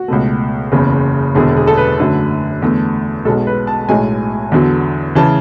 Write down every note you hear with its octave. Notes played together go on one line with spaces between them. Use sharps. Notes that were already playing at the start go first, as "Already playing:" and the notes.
Already playing: F#4
C#2 B2 A3
F#1 E2 C#3
E1 E2 D3 G#4
G#4
A4
B4
F#2 D3 F#3 A3
E2 D3 A3
B1 B2 G#3 A4
B4
A5
B1 A2 G#3 G#5
E2 D3 F#3
C#3 E3 A5